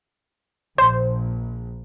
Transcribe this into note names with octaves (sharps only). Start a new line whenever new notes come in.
A#1 C5